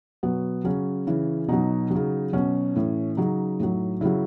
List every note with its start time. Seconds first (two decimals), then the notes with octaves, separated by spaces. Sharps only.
0.23 B2 F#3 B3
0.64 C#3 F#3 C#4
1.07 C#3 E3
1.48 B2 F#3 D#4
1.91 C#3 F#3
2.33 B2 F#3 C#4
2.75 A2 E3
3.17 C#3 F#3 D#4
3.60 A2 F#3
4.01 C#3 F#3 E4